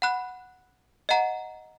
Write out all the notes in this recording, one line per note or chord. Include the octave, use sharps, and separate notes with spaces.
F#5 B5 F#6
D#5 F#5 A#5